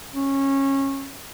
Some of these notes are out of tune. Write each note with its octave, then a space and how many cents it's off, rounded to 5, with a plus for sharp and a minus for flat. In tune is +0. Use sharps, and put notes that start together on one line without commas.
C#4 -20